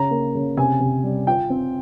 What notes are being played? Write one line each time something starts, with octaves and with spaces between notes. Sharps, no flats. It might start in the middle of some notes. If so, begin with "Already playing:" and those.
Already playing: C#3 A#5
A#3
C#3
C3 G#5
C3
G3
F4 G5
C4